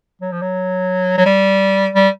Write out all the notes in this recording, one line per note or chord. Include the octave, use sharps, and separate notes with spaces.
F#3
F3
F#3
F#3
G3
G3